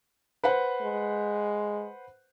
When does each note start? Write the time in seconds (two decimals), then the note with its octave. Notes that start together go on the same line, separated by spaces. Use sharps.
0.44 B4 C5 F#5
0.82 G#3